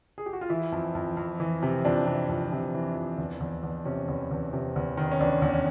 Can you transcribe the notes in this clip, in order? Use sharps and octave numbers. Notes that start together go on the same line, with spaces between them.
G#4
G4
F#4
F4
E3 E4
F2
F2
F2
E3
C3
F2 D4
C3
F2
C3
E3
F2
E2
E2
E2
C3 C#4
E2
E2
C3
E2
D#3
C#4
E2 D4
E2
C#4